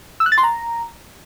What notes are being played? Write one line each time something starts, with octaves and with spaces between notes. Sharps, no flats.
E6
F#6
A6
C6
A#5